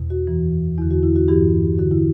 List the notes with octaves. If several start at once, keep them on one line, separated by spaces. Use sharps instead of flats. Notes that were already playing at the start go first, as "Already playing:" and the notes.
Already playing: E2 B2
F#4
F#2 E3
E2 D3 E4
F#4
E4
F#4
G2 E3 E4 G4
G2 D3 F#4
E4